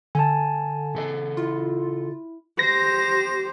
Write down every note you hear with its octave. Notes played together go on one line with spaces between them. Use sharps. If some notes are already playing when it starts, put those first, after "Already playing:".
D3 G#5 A5
C#3 A4 D#5
E4 F4
G4 C5 A#6